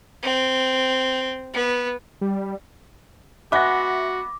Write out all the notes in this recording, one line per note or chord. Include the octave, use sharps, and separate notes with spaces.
C4
B3
G3
G#3 B3 F#4 E5 F#5 D6 A#6